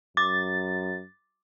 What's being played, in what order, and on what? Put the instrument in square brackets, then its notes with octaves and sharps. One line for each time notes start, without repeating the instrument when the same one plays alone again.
[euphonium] F#2 [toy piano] D6 [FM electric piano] A6